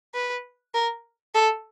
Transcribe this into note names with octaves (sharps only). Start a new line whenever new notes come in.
B4
A#4
A4